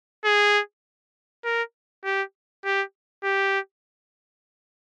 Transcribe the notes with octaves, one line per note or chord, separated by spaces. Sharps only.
G#4
A#4
G4
G4
G4